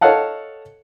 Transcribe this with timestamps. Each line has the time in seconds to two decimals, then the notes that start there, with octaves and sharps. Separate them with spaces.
0.01 A4 C#5 D#5 F5 F#5 A5